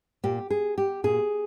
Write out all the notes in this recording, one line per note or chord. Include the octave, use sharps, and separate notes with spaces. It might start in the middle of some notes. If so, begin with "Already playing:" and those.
A#2 G4
G#4
G4
A#2 G#4